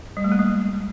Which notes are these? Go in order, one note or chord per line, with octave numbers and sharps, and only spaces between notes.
G3
A3
A#3
G#3